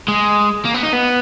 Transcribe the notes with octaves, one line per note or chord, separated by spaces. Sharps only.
G#3
A#3
B3
D#4
B3